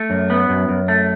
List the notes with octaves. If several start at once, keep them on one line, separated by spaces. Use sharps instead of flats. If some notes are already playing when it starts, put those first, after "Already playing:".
Already playing: A3
F#2
B3
F#2
F#2
A3